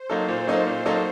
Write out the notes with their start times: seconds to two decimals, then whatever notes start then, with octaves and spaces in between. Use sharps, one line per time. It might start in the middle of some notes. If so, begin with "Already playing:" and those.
Already playing: C5
0.10 F#3 A#3 D#4 A4
0.28 A#2
0.47 F#3 A#3 D#4 A4
0.67 A#2
0.86 F#3 A#3 D#4 A4